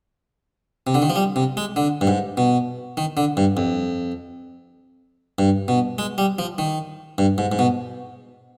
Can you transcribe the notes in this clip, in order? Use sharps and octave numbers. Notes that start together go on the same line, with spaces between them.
C3
D3
D#3
F3
G3
C3
G#3
D3
G2
G#2
B2
D#3
D3
G2
F2
G2
B2
G#3
G3
F3
D#3
G2
G#2
G#2
B2